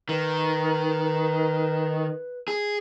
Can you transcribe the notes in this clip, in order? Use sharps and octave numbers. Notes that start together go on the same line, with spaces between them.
D#3 B4
G#4